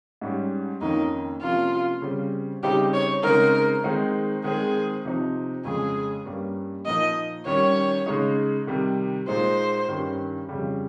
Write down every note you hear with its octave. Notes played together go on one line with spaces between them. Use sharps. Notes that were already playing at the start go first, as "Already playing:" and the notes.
G#2 G3 C#4
F2 D#3 A#3 C#4 D#4
C3 F3 A#3 C#4 F4
C#3 G3 C4
C#3 G3 C4 D#4 G4
C#5
C#3 G#3 C4 D#4 A#4
D#3 G#3 C4 D#4
D#3 G#3 C4 G#4
C3 F3 C4 D#4
F2 C#3 G#3 C#4 G#4
G2 G3 A#3 C#4
A#2 F3 A#3 D#4 D#5
D#3 G3 C#4 C#5
C#3 G#3 D#4
C3 D#3 G3
A#2 G#3 D#4 C5
G2 D#3 G3 C#4
F2 C#3 G3